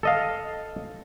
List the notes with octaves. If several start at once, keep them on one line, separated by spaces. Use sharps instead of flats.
A4 D#5 F5